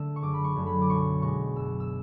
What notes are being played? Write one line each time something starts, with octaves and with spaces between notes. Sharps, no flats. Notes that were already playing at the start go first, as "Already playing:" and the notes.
Already playing: D3 A3 E6
C#6
F#1 D6
B5
C#6
F#2 D3 F#3 A3
B5
D6
B1 C#6
B2 G#3 C#6
F#2 E6
E6